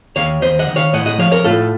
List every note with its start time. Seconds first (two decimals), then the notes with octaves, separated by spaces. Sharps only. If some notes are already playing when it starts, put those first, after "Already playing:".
0.16 D#2 C#5 F5
0.42 D#2 C5 D#5
0.59 D#5 F#5
0.68 D#3
0.76 C#5 F5
0.93 A2 D#5 F#5
1.06 D#5 F#5
1.19 F3 C#5 F5
1.32 A#4 C#5
1.44 A2 F4 A4